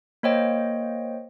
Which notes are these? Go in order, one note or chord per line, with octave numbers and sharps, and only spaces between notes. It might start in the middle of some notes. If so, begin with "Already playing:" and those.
A#3 C5 C#5 D#5 G5